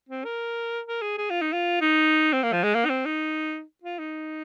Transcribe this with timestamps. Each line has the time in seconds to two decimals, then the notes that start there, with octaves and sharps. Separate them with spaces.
0.09 C4
0.25 A#4
0.86 A#4
1.02 G#4
1.18 G#4
1.30 F4
1.42 D#4
1.53 F4
1.81 D#4
2.33 C4
2.43 A#3
2.53 F3
2.64 G#3
2.75 A#3
2.85 D#4
2.89 C4
3.06 D#4
3.83 F4
3.99 D#4